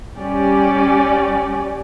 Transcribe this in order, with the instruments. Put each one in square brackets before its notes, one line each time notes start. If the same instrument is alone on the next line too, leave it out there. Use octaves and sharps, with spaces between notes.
[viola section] G3 C#4 G4 D5